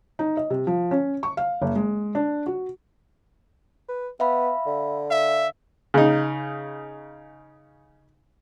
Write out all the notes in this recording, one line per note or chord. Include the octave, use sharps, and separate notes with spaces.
D#4
D#5
C3
F3
C#4
C#6
F5
F#1
G#3
D4
F#4
B4
B3 E5 F5 B5
D3
E5 F5
C#3 D#4